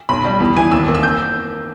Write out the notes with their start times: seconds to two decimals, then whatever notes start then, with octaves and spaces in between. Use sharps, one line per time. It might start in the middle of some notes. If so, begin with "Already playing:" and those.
0.09 B1 B5
0.25 G3
0.40 E2
0.56 E3 G#5
0.71 D#2 E6
0.88 A#3
0.95 E6
1.03 G6